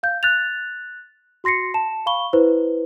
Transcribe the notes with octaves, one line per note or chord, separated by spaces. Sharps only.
F5 G6
F#6 A6 F7
F#4 C6 A#6 C7 C#7
A5 E7
F5 B5 C#6 G7
E4 B4 C5